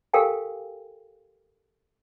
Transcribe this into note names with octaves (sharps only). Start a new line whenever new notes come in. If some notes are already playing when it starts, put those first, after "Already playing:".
G4 A4 A#4 F5 G5 G#5